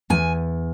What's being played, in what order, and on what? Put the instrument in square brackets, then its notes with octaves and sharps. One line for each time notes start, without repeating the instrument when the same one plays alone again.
[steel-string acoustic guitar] E2 G#5